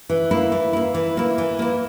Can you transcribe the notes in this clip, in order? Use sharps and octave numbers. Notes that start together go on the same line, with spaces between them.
E3
A#3 E4
E3
A#3 E4
E3
A#3 E4
E3
A#3 E4